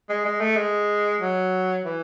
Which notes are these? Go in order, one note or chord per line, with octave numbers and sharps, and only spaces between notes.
G#3
G#3
A3
G#3
F#3
E3